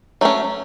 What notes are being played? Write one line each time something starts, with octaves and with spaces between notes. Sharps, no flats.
F#3 A3 C#4